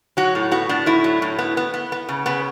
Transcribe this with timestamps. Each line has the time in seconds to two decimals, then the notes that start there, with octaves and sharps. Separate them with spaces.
0.17 F#3 F#4
0.35 A2
0.51 B3 F#4
0.69 A2 D4
0.86 A2 E4
1.04 F#3
1.22 A2
1.39 B3
1.57 B3
1.74 B3
1.92 B3
2.09 C#3
2.26 C#3 B3